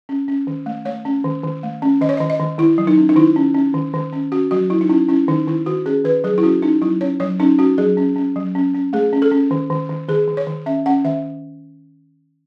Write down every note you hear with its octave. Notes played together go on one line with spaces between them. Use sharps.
C#4
C#4
D#3
A3
A3 C#5
C#4
D#3
D#3
A3
C#4
D#3 D#5
C#5
D#5
D#3
D#5
D#3
D#3 E4
F#3
D#4
C#4
D#4
D#3 E4
C#4
C#4
D#3
D#3
C#4
C#4 F#4
F#3 F#4
F#3 E4
D#4
C#4 E4
C#4 E4
D#3 D#4
D#3 E4
D#3 F#4
C#4 G#4
D#3 B4
F#3 G#4
E4
C#4 F#4
C#4 D#4
F#3 E4
C#4 C#5
F#3 C#5
C#4 D#4
C#4 F#4
F#3 G#4
C#4
C#4
F#3
C#4
C#4
A3 G#4
C#4
A4
C#4
D#3
D#3
D#3
D#3 G#4
D#3
C#5
D#3
C#4 E5
C#4 F#5
D#3 E5